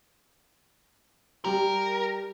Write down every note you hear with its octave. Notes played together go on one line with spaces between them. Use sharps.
G3 G4 A#4